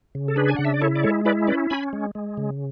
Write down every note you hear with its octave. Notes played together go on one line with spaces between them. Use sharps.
C#3
A4
D4 G#4 B4
G#5
C#3 F#5
E5
D5
E4 A4 C#5
D5
G#3 A4 C#5
E4 B4 D5
C#4 B4 D5
C#4 G#5 B5
G#3
G#3
C#3